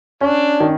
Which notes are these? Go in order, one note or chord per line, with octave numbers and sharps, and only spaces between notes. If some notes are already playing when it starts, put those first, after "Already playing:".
C#4 D4
D#3